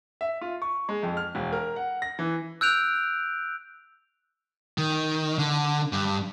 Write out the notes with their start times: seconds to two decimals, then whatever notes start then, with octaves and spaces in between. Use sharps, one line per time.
0.21 E5
0.41 F4
0.62 C#6
0.89 G#3
1.03 F2
1.17 F6
1.35 E1
1.53 A#4
1.76 F#5
2.02 A#6
2.19 E3
2.61 E6 F#6 G6 D7 F7
4.78 D#3
5.38 D3
5.93 G2